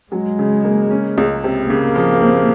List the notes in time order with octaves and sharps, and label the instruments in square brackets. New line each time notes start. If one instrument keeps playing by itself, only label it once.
[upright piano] F#3 [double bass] G#3
[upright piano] C#3
A#3
C#4
C#2
C3
[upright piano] C#3 [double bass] A#3
[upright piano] F3
C4